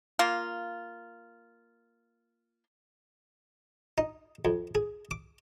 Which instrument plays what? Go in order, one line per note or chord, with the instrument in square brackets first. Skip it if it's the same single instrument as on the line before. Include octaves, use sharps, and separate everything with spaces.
[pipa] A#3 F4
[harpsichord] D#4
F2
G#4
D6